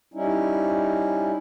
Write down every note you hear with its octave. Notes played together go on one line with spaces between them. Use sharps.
G3 C#4 D#4 E4